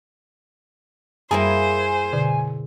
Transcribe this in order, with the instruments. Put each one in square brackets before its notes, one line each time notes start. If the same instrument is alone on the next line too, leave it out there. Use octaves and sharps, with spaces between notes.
[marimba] F#2 G3 [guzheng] A#3 E4 G#4 [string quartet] C5 [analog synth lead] G#5
[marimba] B2 D3